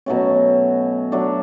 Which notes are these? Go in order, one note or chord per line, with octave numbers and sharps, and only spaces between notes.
B2 F#3 A3 C#4
F#3 A3 D4